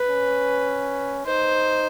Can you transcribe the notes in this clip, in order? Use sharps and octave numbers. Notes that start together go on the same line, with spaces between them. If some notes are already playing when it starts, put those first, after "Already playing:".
Already playing: B4
C#4
D#4 C5